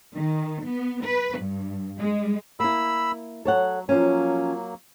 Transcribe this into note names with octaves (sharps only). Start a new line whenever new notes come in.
D#3
B3
B4
G2
G#3
A#3 E4 B5 E6
F#3 A4 C#5 F#5
F3 F#3 A#3 C#4